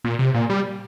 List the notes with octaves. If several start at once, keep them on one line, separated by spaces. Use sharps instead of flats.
A#2
C3
A#2
G3